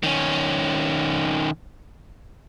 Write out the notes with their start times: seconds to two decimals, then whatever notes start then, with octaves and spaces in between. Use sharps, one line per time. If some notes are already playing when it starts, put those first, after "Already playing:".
0.03 D#3 C#4